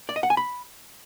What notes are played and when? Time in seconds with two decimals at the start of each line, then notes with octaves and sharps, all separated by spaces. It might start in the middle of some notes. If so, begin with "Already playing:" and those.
0.09 D5
0.16 D#5
0.23 F#5
0.30 G#5
0.37 B5